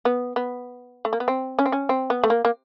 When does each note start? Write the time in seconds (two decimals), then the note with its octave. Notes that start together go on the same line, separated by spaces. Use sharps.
0.05 B3
0.36 B3
1.05 A3
1.13 A#3
1.20 B3
1.28 C4
1.59 C#4
1.66 C4
1.72 C#4
1.89 C4
2.10 B3
2.24 A3
2.30 A#3
2.45 A#3